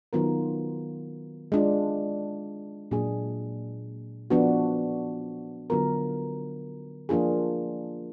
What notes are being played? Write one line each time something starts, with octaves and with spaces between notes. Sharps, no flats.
D#3 F#3 B3 F4 A#4
G#3 D4 F4
A#2 F#3 D4 G#4
F3 B3 D4 F#4
D3 F#3 B3 F4 A#4
F3 A#3 D4 F4 G#4